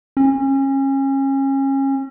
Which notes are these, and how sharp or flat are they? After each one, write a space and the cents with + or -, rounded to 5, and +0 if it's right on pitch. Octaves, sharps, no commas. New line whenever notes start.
C#4 -30